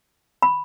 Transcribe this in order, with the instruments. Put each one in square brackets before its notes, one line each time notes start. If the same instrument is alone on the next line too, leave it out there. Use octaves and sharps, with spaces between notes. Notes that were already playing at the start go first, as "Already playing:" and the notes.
[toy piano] B5